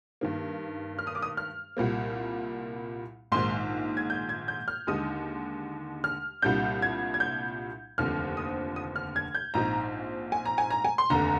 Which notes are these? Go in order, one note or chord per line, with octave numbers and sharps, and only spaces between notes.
G2 D#3 A#3
F6
D#6
D6
D#6
F6
C2 A#2 G3 A#3
A#1 G#2 D#3 G#3 C6
G#6
G6
G#6
G6
F6
D#2 D3 G#3 D#4 D#6
F6
C2 A#2 G3 D4 G6
G#6
G#6
G6
F1 D#2 D3 F3 C4 F6
D#6
D#6
F6
G#6
G6
A#1 G#2 F3 C4 D#4 A#5
G#5
A#5
G#5
A#5
G#5
C6
F1 D#2 D3 A#5